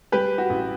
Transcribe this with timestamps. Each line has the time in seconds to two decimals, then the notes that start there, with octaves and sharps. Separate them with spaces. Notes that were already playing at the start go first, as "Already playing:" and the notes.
0.12 G3 G4 B4
0.38 F#4
0.50 A1